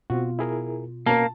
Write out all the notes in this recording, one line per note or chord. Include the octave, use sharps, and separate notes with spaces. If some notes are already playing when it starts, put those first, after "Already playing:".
B2 C4 F4 F#4
E4 G#4 A#4
B2 A#3 C#4 A#4 A5